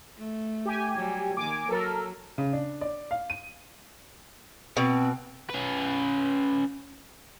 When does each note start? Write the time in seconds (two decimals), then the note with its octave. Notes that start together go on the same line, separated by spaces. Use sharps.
0.18 A3
0.65 G4 G#5
0.96 F#3 G3
1.37 D#3 A#3 G#5 D6
1.69 F#3 A4 A#4
2.38 C#3
2.53 D4
2.81 D5
3.11 F5
3.30 D#7
4.77 B2 C4
5.50 C#4 B4